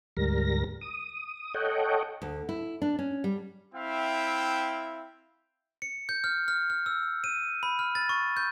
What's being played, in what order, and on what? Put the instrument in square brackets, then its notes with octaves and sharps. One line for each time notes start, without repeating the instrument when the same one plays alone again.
[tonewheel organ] D2 G#2 G3 A#4 A#6
D#6
A4 C#5 D#5 F#5 G5
[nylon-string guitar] D2
E4
D4
C#4
G3
[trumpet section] C4 E4 E5 F5 G5
[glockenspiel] C#7
G6
F6
F6
F6
E6
D#7
B5
F6
A6
C#6
G6